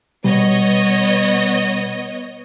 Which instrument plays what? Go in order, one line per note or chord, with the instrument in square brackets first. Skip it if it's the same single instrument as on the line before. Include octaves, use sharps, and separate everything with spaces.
[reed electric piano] B2 G3 [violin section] B3 C#5 D#5